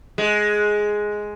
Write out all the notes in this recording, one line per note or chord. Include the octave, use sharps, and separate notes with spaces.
G#3